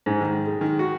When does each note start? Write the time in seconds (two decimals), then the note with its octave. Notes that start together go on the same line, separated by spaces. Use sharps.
0.06 G#2
0.21 D#3
0.46 G#3
0.61 D#3
0.79 F#4